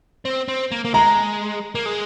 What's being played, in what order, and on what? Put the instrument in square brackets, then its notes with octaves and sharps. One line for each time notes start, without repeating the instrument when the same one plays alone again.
[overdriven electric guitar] C4
C4
A#3
A#3
[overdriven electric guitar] G#3 [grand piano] A#5
[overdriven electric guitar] A#3
G#3